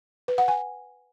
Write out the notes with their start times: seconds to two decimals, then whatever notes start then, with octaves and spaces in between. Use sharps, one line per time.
0.28 B4
0.38 F#5
0.48 G#5